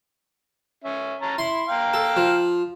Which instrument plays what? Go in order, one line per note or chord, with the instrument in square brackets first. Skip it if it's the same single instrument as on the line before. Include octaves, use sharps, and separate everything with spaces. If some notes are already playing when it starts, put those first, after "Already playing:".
[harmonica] C#4 E5
C#4 A5 A#5
[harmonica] E4 B5 [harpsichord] C6
[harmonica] F5 G5 A#5
[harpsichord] A4
F3